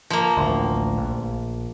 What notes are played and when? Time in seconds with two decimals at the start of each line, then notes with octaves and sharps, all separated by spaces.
0.10 F3 A#3
0.37 A1 D2
0.97 A#1